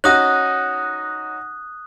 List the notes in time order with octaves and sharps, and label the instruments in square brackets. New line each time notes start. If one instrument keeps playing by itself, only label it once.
[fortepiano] C#4 D#4 F#4 [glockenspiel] D#6 F#6